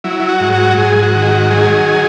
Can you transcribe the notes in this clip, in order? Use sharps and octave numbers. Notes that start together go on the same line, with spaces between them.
F#3 E4
E4
F#4
G#2
F#4
G#2 G#4
F#4
D#3
G#4
F#4
F#3 G#4